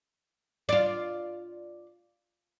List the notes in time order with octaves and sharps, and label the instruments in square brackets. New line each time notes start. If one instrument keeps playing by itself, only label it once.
[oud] F4 D5